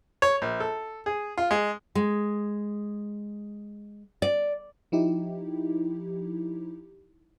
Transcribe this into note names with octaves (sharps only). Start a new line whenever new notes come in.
C#5
A#1
A4
G#4
F4
G#3
G#3
D5
F3 D#4 E4 G4